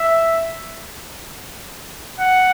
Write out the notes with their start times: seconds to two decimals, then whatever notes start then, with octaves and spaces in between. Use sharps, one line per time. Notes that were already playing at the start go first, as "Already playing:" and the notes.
Already playing: E5
2.20 F#5